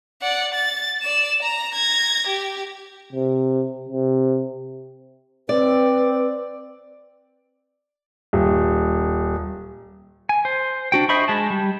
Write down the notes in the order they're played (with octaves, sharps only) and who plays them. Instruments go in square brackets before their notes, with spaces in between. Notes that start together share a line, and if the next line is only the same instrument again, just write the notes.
[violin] D5 F#5
A6
D5 E7
A#5
G#6 A#6
G4
[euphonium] C3
C3
[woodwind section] C4 [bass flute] B4 [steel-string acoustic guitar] D5
[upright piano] D#1
[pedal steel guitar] G#5
C5
D4 F#4 G5
C5 D#5 E5 B5 C#6
G#3 A5
G3